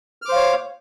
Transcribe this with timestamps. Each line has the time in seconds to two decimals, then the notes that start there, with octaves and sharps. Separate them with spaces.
0.22 F6
0.25 D6
0.29 C5
0.32 F5
0.36 C#5